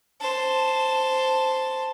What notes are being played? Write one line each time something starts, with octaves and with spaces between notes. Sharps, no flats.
C5 A5